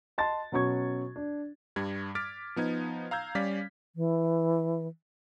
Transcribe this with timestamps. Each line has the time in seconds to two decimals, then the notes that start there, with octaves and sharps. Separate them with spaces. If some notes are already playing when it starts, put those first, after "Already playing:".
0.18 D#5 A5 C6 A6
0.52 B2 F#3 C#4 C#6 G#6
1.16 D4
1.76 G2 G3 G#6
2.15 D6 F6 A6 B6 D7
2.56 F3 B3 D#4 G#6
3.11 F5 A#5 E6 G6 G#6
3.35 G3 C#4 D5 F5 B6
3.96 E3